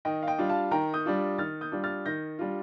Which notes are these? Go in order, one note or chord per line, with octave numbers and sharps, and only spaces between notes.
D#3 D#5 G5
F5
D#5 G5
G3 D4 F4
F5 A5
D#3 G5 A#5
D#6 G6
G3 D4 F4
D#3 F6 A6
D#6 G6
G3 D4 F4
F6 A6
D#3 G6 A#6
G3 D4 F4